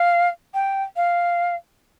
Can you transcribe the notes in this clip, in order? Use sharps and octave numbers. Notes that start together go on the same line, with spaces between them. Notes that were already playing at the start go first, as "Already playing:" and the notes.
Already playing: F5
G5
F5